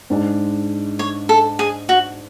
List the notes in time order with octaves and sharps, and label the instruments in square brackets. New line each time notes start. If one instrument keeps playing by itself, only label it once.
[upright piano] G#2 G#3 D4
[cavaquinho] C#5
A4
G#4
F#4